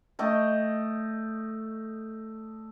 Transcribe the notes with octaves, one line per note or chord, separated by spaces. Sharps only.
A3 D#5 G5